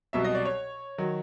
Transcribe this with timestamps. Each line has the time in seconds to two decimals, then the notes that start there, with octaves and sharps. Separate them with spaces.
0.13 C2 B2 F#3 E5
0.24 D#5
0.35 D5
0.45 C#5
0.98 D#3 F#3